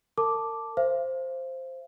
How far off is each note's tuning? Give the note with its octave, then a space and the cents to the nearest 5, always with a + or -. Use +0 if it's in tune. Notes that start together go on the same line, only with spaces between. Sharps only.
A#4 -35 A5 +0 D6 +0
C5 +0 F5 -40